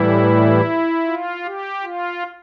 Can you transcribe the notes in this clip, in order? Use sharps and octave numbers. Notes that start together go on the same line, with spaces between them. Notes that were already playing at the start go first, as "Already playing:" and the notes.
Already playing: A2 E3 G3 E4
F4
G4
F4